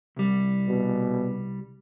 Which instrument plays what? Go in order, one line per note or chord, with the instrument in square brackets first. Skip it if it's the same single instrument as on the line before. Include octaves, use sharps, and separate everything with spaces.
[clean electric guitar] C2 G3
[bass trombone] B2